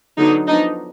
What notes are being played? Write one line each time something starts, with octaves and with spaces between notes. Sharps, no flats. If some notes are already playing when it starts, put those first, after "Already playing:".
D3 F#3 B3 D4 D#4
F3 B3 D4 D#4